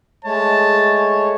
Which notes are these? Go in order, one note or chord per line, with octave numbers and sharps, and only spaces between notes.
G#3 A3 C#5 A5